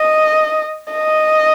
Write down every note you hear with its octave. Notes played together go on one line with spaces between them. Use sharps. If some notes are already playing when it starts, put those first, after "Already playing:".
Already playing: D#5
D#5